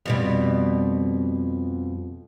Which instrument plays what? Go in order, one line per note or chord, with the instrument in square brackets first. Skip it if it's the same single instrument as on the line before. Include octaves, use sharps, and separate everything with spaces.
[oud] F2 B2 G3